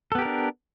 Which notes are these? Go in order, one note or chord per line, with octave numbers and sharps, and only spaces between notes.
B3 D4 G4 A4 A#4